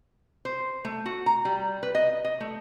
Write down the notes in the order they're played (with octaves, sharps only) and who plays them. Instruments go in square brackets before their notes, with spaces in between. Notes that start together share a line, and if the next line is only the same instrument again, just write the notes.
[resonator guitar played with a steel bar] C5
A3
F#4
A#5
G3
B4
D#5
D#5
A3